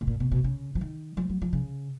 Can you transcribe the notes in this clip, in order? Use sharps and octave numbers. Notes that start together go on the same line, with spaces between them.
B2
A#2
B2
B2
C#3
F3
D#3
F3
F#3
F3
C#3